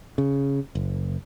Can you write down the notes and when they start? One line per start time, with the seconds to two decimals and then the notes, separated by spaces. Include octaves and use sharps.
0.18 C#3
0.75 F#1